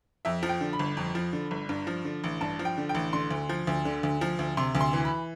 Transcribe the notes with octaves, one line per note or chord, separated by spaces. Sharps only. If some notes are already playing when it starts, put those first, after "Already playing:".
F2 E5
F3
G5
D3
B5
G1
F2
F3
D3
G1
G2
F3
D3
A1
G2 A5
F3
G5
D3
G5
A1
D3 C6
D2
F3
D2
D3
D2
F3
D2
C3 C6
D2
C6
E3
B5